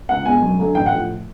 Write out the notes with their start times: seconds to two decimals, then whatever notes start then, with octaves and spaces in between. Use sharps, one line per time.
0.09 C#2 F#5
0.26 B2 G#3 G#5
0.42 F#2
0.59 D3 F#3 A3
0.75 A1 G5
0.86 F#5
0.92 A2 F3